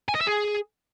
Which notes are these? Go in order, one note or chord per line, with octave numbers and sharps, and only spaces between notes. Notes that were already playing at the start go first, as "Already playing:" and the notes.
G#5
D#5
E5
G#4